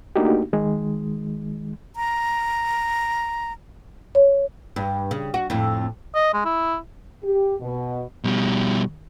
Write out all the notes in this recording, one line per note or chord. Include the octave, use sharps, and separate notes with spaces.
A3 A#3 D4 D#4 F#4 G4
D#3 G#3
A#5
C#5
G2
C#3
F#4
F2 A2
D#5
G#3
E4
G4
B2
B2 G3